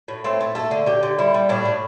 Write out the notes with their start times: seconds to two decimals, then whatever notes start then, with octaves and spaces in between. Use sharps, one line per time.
0.08 A2
0.24 A3 C4
0.41 A3
0.55 A3 A4
0.71 D3
0.86 D3 G4
1.03 D3
1.18 G3 E4
1.34 G3
1.49 A2 D4
1.65 A2